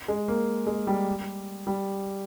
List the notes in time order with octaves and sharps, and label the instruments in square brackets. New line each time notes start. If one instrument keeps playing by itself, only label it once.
[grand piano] G#3
A#3
G#3
G3
G3